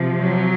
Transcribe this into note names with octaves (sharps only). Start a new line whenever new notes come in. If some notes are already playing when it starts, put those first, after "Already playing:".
Already playing: C3 F3
F#3